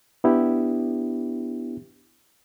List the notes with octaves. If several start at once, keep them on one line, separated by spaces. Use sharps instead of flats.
B3 D4 E4 G4